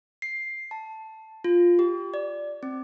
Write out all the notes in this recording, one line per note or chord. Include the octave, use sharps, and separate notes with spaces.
C7
A5
F4
G4
D5
C4